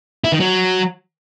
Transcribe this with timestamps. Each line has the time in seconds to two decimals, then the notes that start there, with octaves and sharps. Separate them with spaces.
0.24 E4
0.32 D#3
0.40 F#3